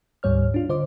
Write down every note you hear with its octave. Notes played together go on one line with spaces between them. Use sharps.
D2 G#2 G3 C#5 F6
D4 F4
D3 C5 D#5 D6